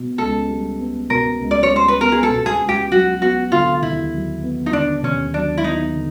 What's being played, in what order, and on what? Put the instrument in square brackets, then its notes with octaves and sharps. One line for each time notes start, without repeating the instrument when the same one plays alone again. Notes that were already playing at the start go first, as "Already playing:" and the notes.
Already playing: [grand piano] B2 B3
[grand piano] C#2 [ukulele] A4
[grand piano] G3
B3
[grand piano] B2 [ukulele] A#4
[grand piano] C#2
[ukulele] D5
C#5
[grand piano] G3
[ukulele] C5
B4
[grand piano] B3 [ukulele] A#4
[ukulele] G#4
A4
[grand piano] B2
[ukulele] G#4
[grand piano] C#2
[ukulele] G4
[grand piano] F#3 [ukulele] F#4
[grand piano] B3 [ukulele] F#4
[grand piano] D3 [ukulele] F4
[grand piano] D#2 [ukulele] E4
[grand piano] F#3
B3
[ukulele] D#4
[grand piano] D3 [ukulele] D4
[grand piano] D#2 [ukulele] C#4
[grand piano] F#3 [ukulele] D4
[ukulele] E4
[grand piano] B3 [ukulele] D#4
[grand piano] D3